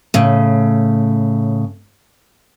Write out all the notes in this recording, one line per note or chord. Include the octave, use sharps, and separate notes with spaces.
A2 C#3